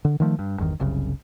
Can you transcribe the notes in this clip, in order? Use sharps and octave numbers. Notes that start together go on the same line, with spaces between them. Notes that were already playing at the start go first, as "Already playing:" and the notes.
D3
D#3 F3 A3
G2
G1 E2 D#3
F#1 C2 C#3